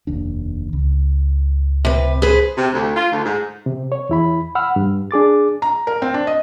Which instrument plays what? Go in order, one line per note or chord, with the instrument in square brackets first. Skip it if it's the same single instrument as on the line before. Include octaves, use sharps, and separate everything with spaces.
[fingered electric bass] F1 D#2 D4
C#2
[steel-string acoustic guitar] C3 B4
G#4 B4 C5
[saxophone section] C3
D2
F4
D2
G#2
[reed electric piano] C3
C#5
E2 E4 B5
F#5 B5 E6 F6
G2
D4 G#4 D6 A6
[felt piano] A#5
A#4
C4
D4
D#5